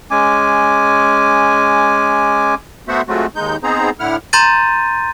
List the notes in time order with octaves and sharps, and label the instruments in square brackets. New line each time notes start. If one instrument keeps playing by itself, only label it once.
[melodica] G#3 C#4 G#5 D6
[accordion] A3 B3 F#4 C5 E5 F#5
F#3 G#3 A3 C4 F4 F#4
D#2 G#3 D#4 G6
B3 C4 D#4 G#4 C5 A#5
A2 D3 E4 F#5 F6
[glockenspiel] A#5 C6 G6 A6 D#7